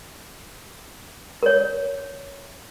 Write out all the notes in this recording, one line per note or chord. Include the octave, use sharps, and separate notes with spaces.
A#4 C#5